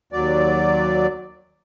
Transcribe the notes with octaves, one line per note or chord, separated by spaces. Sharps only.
D#2 F#3 D5